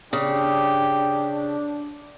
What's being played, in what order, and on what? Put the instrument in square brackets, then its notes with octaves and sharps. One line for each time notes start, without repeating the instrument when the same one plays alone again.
[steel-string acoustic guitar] C#3 [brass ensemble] D4 [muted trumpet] G4